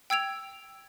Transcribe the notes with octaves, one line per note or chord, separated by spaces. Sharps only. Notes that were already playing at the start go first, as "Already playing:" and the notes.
G5 E6 G#6 D7 F7